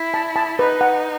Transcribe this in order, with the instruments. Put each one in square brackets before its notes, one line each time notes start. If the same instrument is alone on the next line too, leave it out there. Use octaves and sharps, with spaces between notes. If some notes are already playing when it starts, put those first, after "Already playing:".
Already playing: [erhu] E4
[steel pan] A5
A5
[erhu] D#4 [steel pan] B4
[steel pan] F#5